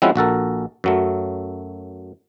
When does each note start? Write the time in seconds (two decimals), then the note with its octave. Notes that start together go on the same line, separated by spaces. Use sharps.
0.02 F3 G#3 C4 C#4 E4 F#4
0.16 A#1 F#4 A4 A#4
0.84 F#2 F#3 A3